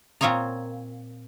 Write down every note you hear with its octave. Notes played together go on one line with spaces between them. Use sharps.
A#2 C4 F4 C#5 D#5 A#5